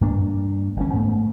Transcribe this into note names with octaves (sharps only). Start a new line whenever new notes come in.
G2 A#3 D4
G1 E3 C#4
G#2 A3 B3